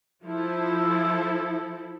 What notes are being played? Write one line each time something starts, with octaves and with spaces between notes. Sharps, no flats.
F3 E4 A4